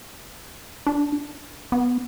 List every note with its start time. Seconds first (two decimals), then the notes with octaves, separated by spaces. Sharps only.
0.87 D4
1.72 B3